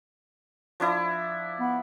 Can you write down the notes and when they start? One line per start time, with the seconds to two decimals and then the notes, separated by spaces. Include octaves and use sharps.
0.80 F3 D4 E4
1.60 B3